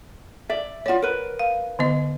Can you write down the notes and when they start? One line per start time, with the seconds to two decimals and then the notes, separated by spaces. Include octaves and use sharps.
0.49 D5 E5
0.86 F4 C#5 D5 F#5
1.02 A#4 B4
1.39 F5
1.79 D3 B3 D#5